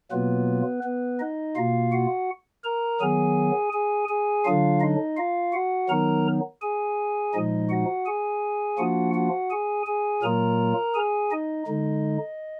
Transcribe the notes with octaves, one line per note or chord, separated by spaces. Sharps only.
B2 F#3 A#3 B3 F4 B4
B3 B4
D#4 D#5
B2 A#3 F4 F5
F#4 F#5
A#4 A#5
D#3 F#3 B3 G#4 G#5
G#4 G#5
G#4 G#5
D3 F#3 D4 F4 F5
D#4 D#5
F4 F5
F#4 F#5
D#3 F#3 B3 D#4 A#4 A#5
G#4 G#5
A#2 F3 G#3 D#4 D#5
F#4 F#5
G#4 G#5
F3 A#3 D4 F4 F#4 F#5
F#4 F#5
G#4 G#5
G#4 G#5
A#2 F#3 A#3 F4 A#4 A#5
G#4 G#5
D#4 D#5
D3 G#3 D#4